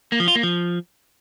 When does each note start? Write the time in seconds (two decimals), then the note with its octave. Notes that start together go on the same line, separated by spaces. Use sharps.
0.12 A#3
0.20 F3
0.28 F4
0.35 A#3
0.43 F3